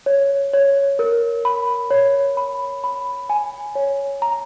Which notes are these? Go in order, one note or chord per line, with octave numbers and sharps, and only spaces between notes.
C#5
C#5
A#4
B5
C#5
B5
B5
G#5
C#5
A#5